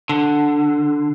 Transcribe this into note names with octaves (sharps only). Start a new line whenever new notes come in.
D3